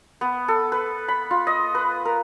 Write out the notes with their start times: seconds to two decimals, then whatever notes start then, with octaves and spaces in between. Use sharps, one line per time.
0.21 B3
0.48 A4
0.72 B4
1.08 B5
1.31 F4
1.47 D#5
1.75 B4
2.05 A#4